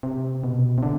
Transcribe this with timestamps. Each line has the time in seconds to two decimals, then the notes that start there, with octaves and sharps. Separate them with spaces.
0.03 C3
0.44 B2
0.78 C3
0.83 D3